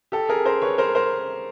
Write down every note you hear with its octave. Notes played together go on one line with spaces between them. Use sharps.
G4 A4
G#4 A#4
A#4 C5
B4 C#5
A#4 C5
A#4 C5